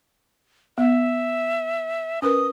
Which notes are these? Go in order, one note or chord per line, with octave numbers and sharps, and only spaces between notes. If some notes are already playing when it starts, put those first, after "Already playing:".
B3 E5
C#4 A#4 B4 D#6